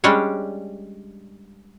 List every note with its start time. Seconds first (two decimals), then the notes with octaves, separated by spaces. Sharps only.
0.04 G3 G#3 C#4 D4 C#5